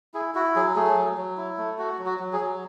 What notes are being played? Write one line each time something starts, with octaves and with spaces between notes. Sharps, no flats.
E4 G#4
E4 F#4
F#3 G#4
A3 G#4
F#3
F#3
E4
A3
F#4
F#3
F#4
F#3
G#4
F#3